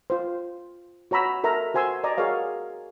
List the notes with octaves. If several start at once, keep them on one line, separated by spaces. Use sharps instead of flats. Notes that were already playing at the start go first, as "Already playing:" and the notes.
F4 C5
F#4 C#5 A#5 B5 E6
A4 A#4 E5 A#5
F#4 C5 G#5 C6 E6
D5 D#5 A#5 D#6
F#4 G#4 A#4 C#5 F5